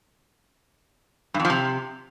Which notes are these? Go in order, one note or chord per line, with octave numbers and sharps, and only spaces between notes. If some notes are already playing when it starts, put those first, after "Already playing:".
G2
F2
F3
C3